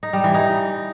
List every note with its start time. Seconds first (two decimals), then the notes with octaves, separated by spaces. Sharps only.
0.03 D#4
0.13 G3
0.24 E3
0.34 D#4